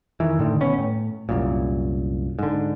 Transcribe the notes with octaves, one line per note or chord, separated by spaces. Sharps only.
F2 D#3 E3
A2 D3 D#3
D#1 B2 B3 C#4
A2
C2 F#2 A#2
G#2 D3